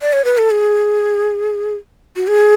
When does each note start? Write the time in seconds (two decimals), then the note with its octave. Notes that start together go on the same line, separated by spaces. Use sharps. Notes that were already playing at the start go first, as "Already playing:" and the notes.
0.00 D5
0.13 C#5
0.25 B4
0.38 A4
0.51 G#4
2.16 F#4
2.27 G#4